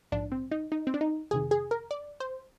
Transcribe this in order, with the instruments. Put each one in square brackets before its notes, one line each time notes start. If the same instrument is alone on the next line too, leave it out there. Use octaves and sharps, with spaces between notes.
[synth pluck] A#1 G#2 F3 D4
C4
D#4
D#4
C4
D4
D#4
F2 C3 D#3 G#4
G#4
A#4
D5
C5